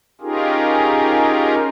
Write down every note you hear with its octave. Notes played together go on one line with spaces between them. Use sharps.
C#4 D#4 F4 G4 G#4 A#4